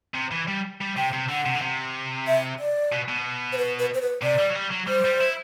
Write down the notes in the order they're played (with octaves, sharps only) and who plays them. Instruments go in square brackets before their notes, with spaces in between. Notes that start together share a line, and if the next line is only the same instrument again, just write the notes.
[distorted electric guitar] C3
E3
G3
G3
[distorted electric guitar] C3 [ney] G5
[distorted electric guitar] C3
[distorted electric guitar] D3 [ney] F#5
[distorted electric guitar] C3
D3
C3
[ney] E5
D5
[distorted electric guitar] B2
B2
[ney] C5
B4
B4
C5
B4
[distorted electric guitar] C3 [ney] D5
[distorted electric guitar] G3
F#3
G3
F#3
[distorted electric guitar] G3 [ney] C5
[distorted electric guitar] G3
E4